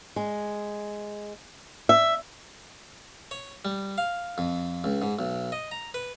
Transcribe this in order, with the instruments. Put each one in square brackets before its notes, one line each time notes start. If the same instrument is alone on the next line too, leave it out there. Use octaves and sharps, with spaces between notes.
[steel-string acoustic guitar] G#3
E5
[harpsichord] C#5
G3
F5
F2
C#2
G#2
B1
D#5
A#5
B4